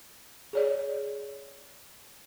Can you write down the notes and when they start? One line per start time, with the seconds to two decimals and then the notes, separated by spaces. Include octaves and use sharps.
0.53 G#4 C#5 D5